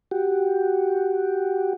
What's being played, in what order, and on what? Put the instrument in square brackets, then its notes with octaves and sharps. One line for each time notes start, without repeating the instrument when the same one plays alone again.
[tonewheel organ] F#4 G4